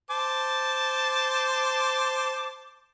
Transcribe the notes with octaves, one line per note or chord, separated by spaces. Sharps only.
C5 A5 D6